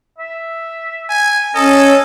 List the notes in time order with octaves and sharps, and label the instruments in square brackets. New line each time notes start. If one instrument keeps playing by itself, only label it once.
[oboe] E5
[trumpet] G#5
[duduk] C#4 [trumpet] A4 [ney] C#5 [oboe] D#5